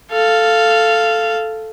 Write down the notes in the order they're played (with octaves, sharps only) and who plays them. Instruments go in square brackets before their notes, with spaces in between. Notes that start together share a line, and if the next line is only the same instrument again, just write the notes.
[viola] A4 F5